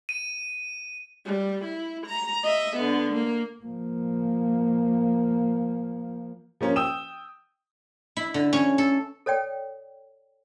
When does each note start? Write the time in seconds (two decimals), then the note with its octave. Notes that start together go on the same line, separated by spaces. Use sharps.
0.09 D#7
1.25 G3
1.65 E4
2.07 A#5
2.43 D#5 E5
2.77 D3 B3
3.13 A#3
3.63 F3 A#3
6.61 F3 A#3 C#4
6.76 G5 D#6 E6 E7
8.17 E4
8.34 D3
8.53 C#4
8.78 A4
9.26 A4 C#5 D5 G5